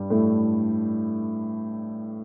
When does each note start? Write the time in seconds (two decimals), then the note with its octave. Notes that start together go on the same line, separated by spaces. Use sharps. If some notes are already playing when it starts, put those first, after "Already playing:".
Already playing: G2 G3
0.10 A2 A3